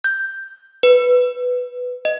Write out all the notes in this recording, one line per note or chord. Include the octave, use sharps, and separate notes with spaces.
G6
B4
D#5